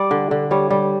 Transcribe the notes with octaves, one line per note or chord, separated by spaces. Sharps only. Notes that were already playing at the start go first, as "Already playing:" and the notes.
Already playing: G3 D5
D3
D3
G3 C#5
G3